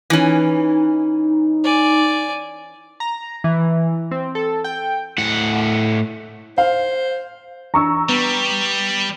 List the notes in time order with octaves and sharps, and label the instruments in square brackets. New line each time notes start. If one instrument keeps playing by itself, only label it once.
[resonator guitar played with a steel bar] E3 C#4 [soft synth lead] D#4
[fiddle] D5 G#5
[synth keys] A#5
E3
C4
A4
G5
[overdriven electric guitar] A2 F#5
[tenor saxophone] C5 [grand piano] F5
[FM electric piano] E3 D4 [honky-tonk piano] A#5 C#6 E6
[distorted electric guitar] G3 [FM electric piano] B3